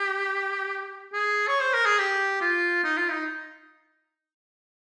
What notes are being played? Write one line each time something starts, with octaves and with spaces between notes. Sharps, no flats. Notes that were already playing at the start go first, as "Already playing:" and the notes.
Already playing: G4
G#4
C#5
C5
A#4
G#4
G4
F4
D#4
F4
D#4